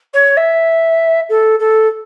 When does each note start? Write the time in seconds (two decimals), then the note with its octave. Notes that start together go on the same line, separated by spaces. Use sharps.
0.13 C#5
0.36 E5
1.29 A4
1.59 A4